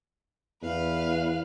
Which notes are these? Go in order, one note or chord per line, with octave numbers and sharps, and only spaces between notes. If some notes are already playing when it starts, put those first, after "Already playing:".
E2 B4 F5